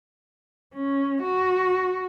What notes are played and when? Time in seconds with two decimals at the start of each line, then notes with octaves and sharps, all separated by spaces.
0.75 C#4
1.23 F#4